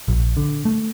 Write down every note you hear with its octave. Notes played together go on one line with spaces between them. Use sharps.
A#1
D3
A3